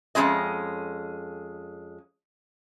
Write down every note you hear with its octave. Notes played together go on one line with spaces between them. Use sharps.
F2 F3 G#3 C#4 D#5